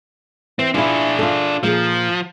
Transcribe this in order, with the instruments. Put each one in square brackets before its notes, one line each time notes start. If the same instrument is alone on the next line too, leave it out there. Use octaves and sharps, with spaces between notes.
[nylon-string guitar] E3 [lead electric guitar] C4
[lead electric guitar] D4 G#4 [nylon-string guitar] E4 F4
[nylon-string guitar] F4 A4
[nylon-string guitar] A#2 G#4 [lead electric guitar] F3